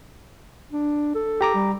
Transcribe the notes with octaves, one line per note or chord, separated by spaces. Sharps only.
D4
A4
G4 A#5 D6
G3